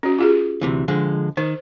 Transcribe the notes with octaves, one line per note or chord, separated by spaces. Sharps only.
C#4 F#4
F4 G4 G#4
D2 C3 E3
D3 F3 G#3
D#3 C5